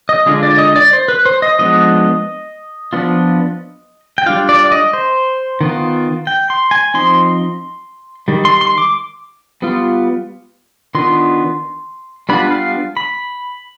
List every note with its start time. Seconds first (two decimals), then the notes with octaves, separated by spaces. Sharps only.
0.09 D#5
0.26 D3 G#3 D4 F4
0.43 D5
0.58 D#5
0.76 D5
0.93 C5
1.08 B4
1.25 C5
1.42 D#5
1.59 F3 G#3 B3 D4 D#5
2.93 F3 B3 D4 F4
4.18 G5
4.26 G3 D4 F4 F5
4.49 D5
4.66 D5
4.72 D#5
4.93 C5
5.61 D#3 B3 F4
6.27 G5
6.50 C6
6.71 G#5
6.94 F3 C4 D#4 C6
8.28 D#3 G3
8.45 C6
8.61 C6
8.78 D6
9.62 G3 B3 F4
10.95 D#3 B3 D4 F4 C6
12.29 G3 B3 D4 F4 B5
12.51 F5
12.97 B5